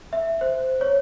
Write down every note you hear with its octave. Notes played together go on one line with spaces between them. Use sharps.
E5
C5
C#5